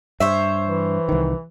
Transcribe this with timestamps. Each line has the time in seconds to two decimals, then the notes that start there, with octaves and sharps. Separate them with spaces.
0.20 G2 C5 C#5 E5
0.65 E3
1.09 C2 D#3